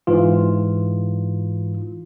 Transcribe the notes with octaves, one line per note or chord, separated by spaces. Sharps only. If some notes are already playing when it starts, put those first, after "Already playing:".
G#2 E3 F4